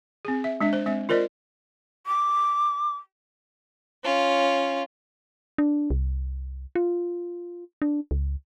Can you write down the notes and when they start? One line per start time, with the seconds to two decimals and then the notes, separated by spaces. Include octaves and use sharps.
0.25 C4 G#4
0.44 E5
0.61 G#3 D4 E5
0.73 C5
0.86 G#3 C4 E5
1.09 F4 A#4 C5 D5 D#5
2.07 D6
4.04 C#4 F4
5.58 D4
5.90 C2
6.75 F4
7.82 D4
8.11 C#2